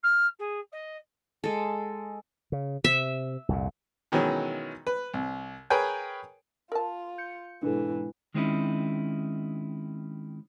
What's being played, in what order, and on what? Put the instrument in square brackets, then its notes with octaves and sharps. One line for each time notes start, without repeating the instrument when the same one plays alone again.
[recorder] F6
G#4
D#5
[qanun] G#3 A4
[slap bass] C#3
[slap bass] C3 [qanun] E5
[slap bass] C2 F2 A#2
[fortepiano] B2 D#3 E3 F#3 G#3 C#4
B4
C2
G#4 A#4 B4 C#5 G5 G#5
[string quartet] F4 [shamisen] A#4 A5
[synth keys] G6 C#7
[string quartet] G#2 B2 E3 [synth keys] D4 A4
[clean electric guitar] D#3 G#3 C4 C#4 D#4 E4